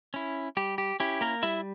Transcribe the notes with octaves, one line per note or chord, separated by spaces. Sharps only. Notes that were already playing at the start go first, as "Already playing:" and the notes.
C#4 E4
G3 G4
G4
C#4 E4 G4
A#3 A#4
G3 E4 E5